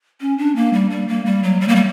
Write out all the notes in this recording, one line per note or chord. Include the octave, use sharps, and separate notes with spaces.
C#4
D4
A#3
G3
G3
A#3
G3
F#3
G3
A#3
G3